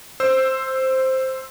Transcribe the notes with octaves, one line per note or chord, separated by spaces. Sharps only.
C5 E6